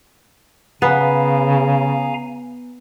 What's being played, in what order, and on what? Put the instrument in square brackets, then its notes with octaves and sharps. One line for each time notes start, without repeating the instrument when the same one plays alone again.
[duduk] C#3 [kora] B3 [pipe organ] F5 G#5 A#5